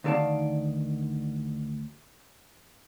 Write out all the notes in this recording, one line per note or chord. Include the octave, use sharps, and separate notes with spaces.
D2 D#3 A4 D5 F5 A5